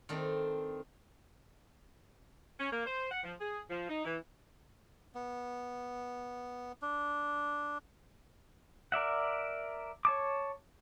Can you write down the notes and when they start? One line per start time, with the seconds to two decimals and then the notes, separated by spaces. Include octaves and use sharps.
0.09 D#3 A3 C4 D4
2.60 C#4
2.71 A#3
2.86 C5
3.11 F#5
3.24 F3
3.40 G#4
3.70 F3
3.89 D#4
4.05 E3
5.15 B3
6.82 D4
8.92 A#4 D5 E5 F#5
10.05 C#5 A5 D6